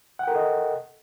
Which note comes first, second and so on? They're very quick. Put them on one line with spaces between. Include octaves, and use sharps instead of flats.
F#5 G5 A#4 A4 D#5